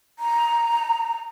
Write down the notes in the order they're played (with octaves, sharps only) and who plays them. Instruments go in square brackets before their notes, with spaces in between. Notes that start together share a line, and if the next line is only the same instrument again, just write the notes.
[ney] A#5